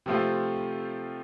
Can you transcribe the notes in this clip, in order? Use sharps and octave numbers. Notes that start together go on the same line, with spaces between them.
C3 F3 A3 C4 F4